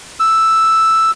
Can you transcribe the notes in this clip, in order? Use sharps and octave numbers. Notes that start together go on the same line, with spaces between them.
E6